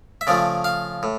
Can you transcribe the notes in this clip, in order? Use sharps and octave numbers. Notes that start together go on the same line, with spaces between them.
E5
C#3 F3 A3 D5
F5
A2